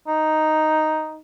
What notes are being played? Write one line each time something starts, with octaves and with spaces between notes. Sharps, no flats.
D#4